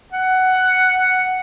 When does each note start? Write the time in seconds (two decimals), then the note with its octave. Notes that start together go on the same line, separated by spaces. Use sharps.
0.12 F#5